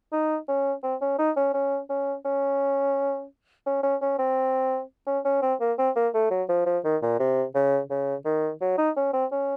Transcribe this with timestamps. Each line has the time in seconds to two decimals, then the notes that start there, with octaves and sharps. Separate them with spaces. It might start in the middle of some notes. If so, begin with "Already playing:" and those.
0.12 D#4
0.48 C#4
0.83 C4
1.02 C#4
1.19 D#4
1.37 C#4
1.54 C#4
1.90 C#4
2.25 C#4
3.66 C#4
3.83 C#4
4.02 C#4
4.19 C4
5.07 C#4
5.25 C#4
5.42 C4
5.61 A#3
5.78 C4
5.96 A#3
6.14 A3
6.31 F#3
6.49 F3
6.66 F3
6.84 D#3
7.02 A#2
7.20 C3
7.55 C#3
7.91 C#3
8.25 D#3
8.61 F#3
8.78 D#4
8.97 C#4
9.13 C4
9.32 C#4